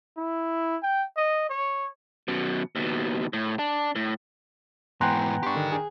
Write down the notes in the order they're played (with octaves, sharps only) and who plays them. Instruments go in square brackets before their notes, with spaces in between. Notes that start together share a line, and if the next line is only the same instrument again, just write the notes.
[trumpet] E4
G5
D#5
C#5
[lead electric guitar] F#2 B2
D#2 B2
A2
D4
A2
[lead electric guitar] G#2 E3 [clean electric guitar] B3 [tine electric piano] G5 G#5 A#5 [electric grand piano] C6 F#6
[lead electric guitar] D4 G4 [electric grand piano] C6 C#6
[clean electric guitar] D3 [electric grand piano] D#3
[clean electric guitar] G#4